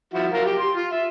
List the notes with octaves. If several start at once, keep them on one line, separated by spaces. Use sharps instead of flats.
F3 E4 F#4
F#3 A#4 F5
G4
C6
F4
E5